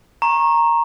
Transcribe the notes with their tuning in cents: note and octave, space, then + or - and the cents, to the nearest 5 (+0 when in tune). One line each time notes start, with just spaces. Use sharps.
A#5 +0 C#6 -25